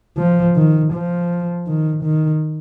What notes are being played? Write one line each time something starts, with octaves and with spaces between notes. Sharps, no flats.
F3
D#3
F3
D#3
D#3